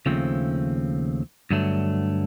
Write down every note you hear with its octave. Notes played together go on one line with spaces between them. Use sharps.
D#2 C#3 F3 A3 C4
G2 D3 F#3 A3